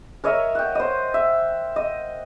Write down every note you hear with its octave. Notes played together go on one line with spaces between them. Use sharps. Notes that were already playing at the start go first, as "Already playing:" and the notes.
A#4 C#5 D#5 E5
F#5 G5
C5 D#5
E5
D#5